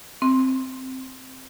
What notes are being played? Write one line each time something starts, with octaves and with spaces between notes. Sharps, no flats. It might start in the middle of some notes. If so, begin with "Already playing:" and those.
C4